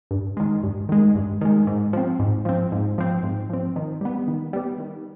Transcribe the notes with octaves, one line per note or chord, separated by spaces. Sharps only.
G2
D#3 G#3
G2
D#3 G#3
G2
D#3 G#3
G#2
F3 C4
G#2
F3 C4
G#2
F3 C4
G#2
F3 C4
D#3
G3 B3
D#3
G3 B3
D#3